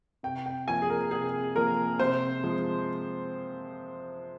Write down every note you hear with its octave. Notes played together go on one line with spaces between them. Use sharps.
C3 G5
G5
F3 A#3 G#5
G#4
A#4
C3 G#4
F3 A#3 A#4
C3 C5
F3 G#3